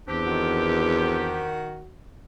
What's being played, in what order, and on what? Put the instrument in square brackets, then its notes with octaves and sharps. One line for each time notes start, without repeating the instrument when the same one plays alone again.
[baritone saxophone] E2 [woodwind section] C4 D4 G4
[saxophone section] D#3 F#4